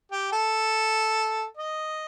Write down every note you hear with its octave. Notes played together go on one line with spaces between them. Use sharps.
G4
A4
D#5